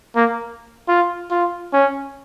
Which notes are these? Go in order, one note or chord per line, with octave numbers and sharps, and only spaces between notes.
A#3
F4
F4
C#4